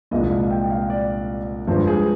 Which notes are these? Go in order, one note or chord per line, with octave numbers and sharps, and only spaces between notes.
C2 A#2 F3 G#3 D#5
F5
G5
F5
D5
G2 F3 G#3 C5
G#4